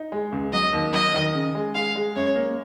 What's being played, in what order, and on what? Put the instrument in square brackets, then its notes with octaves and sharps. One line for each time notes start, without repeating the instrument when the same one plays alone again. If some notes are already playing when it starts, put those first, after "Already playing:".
Already playing: [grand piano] D#4
G#3
C#2
[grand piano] F#3 [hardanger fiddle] D#5
[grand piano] D#2
[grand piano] F#3 [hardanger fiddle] D#5
[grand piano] D#3
C#3
G#3
[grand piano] G#3 [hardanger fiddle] F5
[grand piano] G#3
[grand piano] F#2 [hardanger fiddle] C#5
[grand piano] A#3